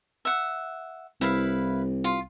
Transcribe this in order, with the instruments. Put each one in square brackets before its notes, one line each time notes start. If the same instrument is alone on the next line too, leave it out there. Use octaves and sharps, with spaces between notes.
[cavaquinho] E5 F#5
[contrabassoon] C2 [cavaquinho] E4 B4 F5
[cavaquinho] F4